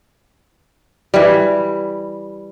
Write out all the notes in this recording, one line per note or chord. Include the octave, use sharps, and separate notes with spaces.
E3 G3